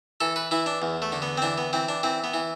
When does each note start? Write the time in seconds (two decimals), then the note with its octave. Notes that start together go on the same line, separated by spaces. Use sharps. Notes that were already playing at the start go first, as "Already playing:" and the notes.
0.21 E3 A4
0.36 B4
0.51 E3 E4
0.66 D4
0.82 E2
1.02 A3
1.12 D3
1.22 B3
1.38 C4
1.42 E3 D4
1.58 B3
1.73 E3 C4
1.89 D4
2.03 E3 C4
2.24 B3
2.34 E3